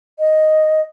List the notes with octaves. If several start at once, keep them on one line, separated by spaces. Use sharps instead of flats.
D#5